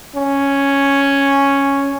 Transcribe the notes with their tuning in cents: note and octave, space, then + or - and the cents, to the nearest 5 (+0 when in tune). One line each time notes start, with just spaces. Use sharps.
C#4 +0